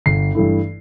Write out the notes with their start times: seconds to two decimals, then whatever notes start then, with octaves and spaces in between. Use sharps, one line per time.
0.06 G1 C7
0.35 G2 E3 A3 E4